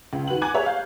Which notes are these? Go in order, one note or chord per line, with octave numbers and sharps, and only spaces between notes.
C#2
D#3 F#4 B4 F#7
F#5 G#5 A#5 D6 F#6 G#6
G4 G#4 C#5 E5 A#5
F5 G6